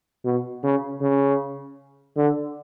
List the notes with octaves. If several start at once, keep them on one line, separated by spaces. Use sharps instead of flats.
B2
C#3
C#3
D3